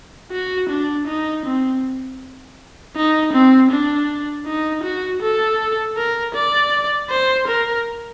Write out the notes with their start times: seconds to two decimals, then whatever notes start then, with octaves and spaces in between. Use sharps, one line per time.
0.32 F#4
0.70 D4
1.07 D#4
1.46 C4
2.96 D#4
3.33 C4
3.71 D4
4.46 D#4
4.84 F#4
5.22 A4
5.97 A#4
6.35 D5
7.10 C5
7.48 A#4